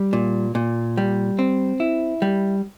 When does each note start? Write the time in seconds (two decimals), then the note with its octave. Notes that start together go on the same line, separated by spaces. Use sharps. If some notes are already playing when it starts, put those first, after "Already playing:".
Already playing: G3
0.13 A#2
0.55 A#2
0.97 G3
1.39 C4
1.80 E4
2.22 G3